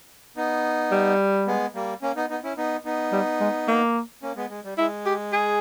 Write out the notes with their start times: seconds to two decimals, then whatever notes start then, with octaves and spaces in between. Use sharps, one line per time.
0.36 B3 D#4
0.91 G3
1.47 G#3 B3
1.75 G3 A#3
2.02 A#3 C#4
2.16 B3 D#4
2.30 B3 D#4
2.44 C#4 E4
2.57 B3 D#4
2.85 B3 D#4
3.12 G3
3.41 G#3
3.68 A#3
4.22 A#3 C#4
4.36 G#3 B3
4.50 G#3
4.64 G3
4.78 G#3 E4
5.06 G4
5.32 G#4